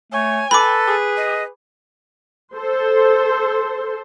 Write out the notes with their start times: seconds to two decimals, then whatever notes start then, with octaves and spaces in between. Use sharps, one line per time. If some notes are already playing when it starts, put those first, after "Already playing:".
0.12 A3 C#5 G#5
0.51 A4 B4 B5 D6
0.87 G#4
1.17 D#5
2.53 A4 C5